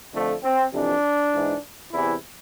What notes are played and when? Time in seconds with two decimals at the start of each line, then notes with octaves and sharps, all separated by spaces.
0.13 F2 D3 F3 A3
0.43 C4
0.72 F2 C3 E3 D4
1.33 G#2 E3
1.92 E2 C3 E3 E4